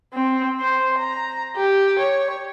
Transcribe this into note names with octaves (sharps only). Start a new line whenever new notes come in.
C4
C5
A#5
G4
C#5